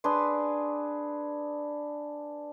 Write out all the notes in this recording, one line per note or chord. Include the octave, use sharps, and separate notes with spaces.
D4 G#4 B4 C6